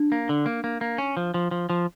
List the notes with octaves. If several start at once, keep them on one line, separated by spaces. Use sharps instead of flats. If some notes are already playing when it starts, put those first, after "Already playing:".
Already playing: D4
A#3
D3
A#3
A#3
A#3
C#4
F3
F3
F3
F3